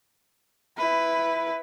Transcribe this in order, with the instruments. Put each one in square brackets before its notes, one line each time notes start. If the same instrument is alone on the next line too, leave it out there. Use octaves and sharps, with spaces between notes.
[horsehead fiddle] E4 B4